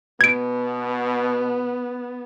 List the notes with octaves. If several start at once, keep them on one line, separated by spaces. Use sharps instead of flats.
B2 B3 G#6 D7